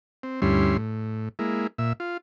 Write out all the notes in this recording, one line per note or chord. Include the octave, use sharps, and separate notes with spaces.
C4
D2 G2 G3 C#4 E4 C6
A2
G#3 A#3 E4
A#2 E5
F4